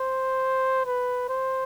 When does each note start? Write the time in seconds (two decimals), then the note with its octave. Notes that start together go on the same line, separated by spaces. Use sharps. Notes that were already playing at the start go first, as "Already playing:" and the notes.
Already playing: C5
0.85 B4
1.28 C5